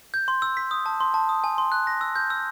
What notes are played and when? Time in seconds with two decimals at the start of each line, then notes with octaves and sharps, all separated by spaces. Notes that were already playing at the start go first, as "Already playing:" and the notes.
0.14 G6
0.28 C6
0.42 E6
0.57 B6
0.71 D#6
0.86 A5
1.00 C6
1.14 A5
1.29 D#6
1.44 G#5
1.58 C6
1.72 F#6
1.87 A#6
2.01 E6
2.15 G6
2.30 E6